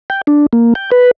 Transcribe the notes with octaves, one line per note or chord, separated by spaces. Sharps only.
G5
D4
A#3
G5
B4